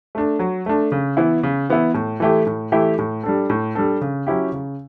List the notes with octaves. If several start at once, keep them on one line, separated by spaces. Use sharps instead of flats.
A3 D4
F#3
A3 D4
C#3
E3 B3 E4
C#3
E3 B3 E4
A2
E3 A3 E4 G4
A2
E3 A3 E4 G4
A2
G3 D4 A4
A2
G3 D4 A4
C#3
F#3 C#4 E4 G4
C#3